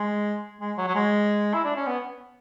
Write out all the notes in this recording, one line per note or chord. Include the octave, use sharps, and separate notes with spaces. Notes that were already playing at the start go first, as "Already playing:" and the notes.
Already playing: G#3
G#3
F#3
F#3
G#3
E4
D4
C#4
B3